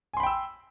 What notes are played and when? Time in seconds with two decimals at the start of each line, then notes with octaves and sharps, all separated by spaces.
0.13 G#5
0.17 C6
0.20 B5
0.23 G5
0.27 E6